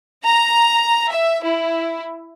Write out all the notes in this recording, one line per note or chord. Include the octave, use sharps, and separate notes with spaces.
A#5
E5
E4